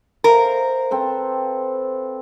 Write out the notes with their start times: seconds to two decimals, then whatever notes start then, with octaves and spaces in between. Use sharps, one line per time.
0.24 A#4 C5 E5 F5
0.91 C4 A4 B4